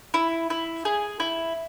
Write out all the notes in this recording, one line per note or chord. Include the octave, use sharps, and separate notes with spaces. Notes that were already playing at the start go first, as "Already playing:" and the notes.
E4
E4
G#4
E4